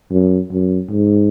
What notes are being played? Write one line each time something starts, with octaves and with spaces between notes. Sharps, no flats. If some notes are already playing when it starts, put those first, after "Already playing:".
F#2
F#2
G#2